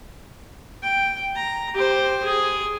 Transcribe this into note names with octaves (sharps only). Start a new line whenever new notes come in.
G5
A#5
G4 C5
G#4